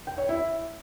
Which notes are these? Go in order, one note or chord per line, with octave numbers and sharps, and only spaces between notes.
G5
C#5
E4